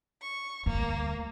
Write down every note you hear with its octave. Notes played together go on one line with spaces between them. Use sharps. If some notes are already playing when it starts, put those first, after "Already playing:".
C#6
D2 G3 A#3